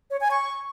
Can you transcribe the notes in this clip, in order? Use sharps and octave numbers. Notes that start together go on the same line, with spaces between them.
C#5
G#5
C#6